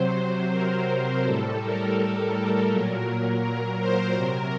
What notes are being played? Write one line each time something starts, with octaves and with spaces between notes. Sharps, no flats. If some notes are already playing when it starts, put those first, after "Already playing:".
Already playing: C3 F#3 C5
A#4
A2 G3 A4
A#4
A#4
A#2 F#3 A#4
A#4
C5
C3 F#3 A#4